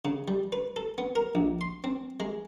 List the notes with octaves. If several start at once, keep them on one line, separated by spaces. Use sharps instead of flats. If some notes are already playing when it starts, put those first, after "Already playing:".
C#3
G3
B4
A4
B3
A#4
A#1
C6
C4
G#3